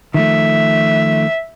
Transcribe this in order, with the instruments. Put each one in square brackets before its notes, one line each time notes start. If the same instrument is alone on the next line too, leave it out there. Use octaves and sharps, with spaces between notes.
[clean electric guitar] D#3 F3 A3 [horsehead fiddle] E5